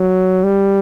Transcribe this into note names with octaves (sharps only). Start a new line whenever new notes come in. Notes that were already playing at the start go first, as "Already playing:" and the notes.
Already playing: F#3
G3